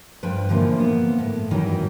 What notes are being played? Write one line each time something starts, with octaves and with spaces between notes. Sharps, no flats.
G2 F3 B4 D5 G5
A#2 D3 E3 F3 A#3
A#3 B3
A2
F#2 D#3 E3 F#3 G3 D#4